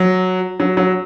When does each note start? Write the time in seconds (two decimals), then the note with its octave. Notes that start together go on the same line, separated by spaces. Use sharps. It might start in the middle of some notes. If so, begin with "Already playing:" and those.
Already playing: F#3
0.60 F#3
0.77 F#3